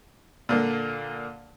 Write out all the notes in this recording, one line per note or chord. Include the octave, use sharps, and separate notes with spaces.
A#2 D3 A#3